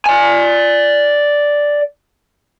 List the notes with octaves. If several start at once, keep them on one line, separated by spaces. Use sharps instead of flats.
D5 G#5